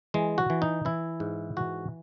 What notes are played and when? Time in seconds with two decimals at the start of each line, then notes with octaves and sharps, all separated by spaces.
0.14 E3 G#3
0.38 F#4
0.50 E3
0.62 D#4
0.85 E3 E4
1.20 G#2
1.57 E3 F#4